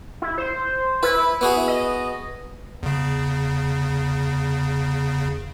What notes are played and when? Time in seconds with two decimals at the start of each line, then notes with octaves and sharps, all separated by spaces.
0.22 E4
0.38 C5
1.03 E4 B4
1.41 B3 F#4 G#4
1.68 D#5
2.83 E2 C#3